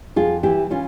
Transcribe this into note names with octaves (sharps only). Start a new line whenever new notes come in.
F2 F4 G#4
E3 E4 G4
E3 C#4 F4